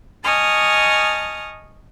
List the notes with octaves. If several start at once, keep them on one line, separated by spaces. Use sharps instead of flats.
D#5 G#5 A5 C#6 D#6 F6